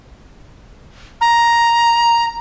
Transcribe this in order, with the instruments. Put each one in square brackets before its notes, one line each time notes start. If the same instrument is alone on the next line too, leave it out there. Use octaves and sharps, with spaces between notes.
[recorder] A#5